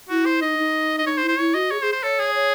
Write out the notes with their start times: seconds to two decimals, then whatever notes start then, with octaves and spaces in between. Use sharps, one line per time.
0.09 E4 F#4
0.25 C5
0.42 D#4 D#5
0.58 D#4
0.98 D#5
1.06 D#4 C#5
1.17 C5
1.23 E4
1.28 C5
1.38 E4 C#5
1.54 F#4 D#5
1.70 G#4 C#5
1.81 G#4 C5
1.92 C5
2.03 A4 C#5
2.19 G#4
2.35 C#5